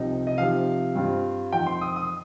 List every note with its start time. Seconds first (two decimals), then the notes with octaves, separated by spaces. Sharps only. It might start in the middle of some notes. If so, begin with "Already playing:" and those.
Already playing: C2 C3 F3 D#4
0.27 D#5
0.38 C3 F3 D#4 F5
0.95 G2 G3 C4 F4
1.53 F2 F3 D#4 G5
1.67 C6
1.81 D#6
1.96 D#6